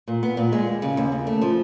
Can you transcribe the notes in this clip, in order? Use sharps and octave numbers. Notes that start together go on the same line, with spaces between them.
A#2
B3
A#2
G#3
D#2
C#3
D#2
C#3
A3
F3